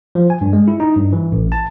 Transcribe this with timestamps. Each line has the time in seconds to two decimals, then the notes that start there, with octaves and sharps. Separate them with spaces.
0.15 F3
0.30 G#5
0.41 G2
0.53 G#3
0.68 E4
0.80 D#4
0.96 G2
1.13 E3
1.32 A1
1.52 A5